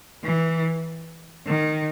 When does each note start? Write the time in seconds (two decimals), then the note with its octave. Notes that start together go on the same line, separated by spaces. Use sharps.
0.24 E3
1.47 D#3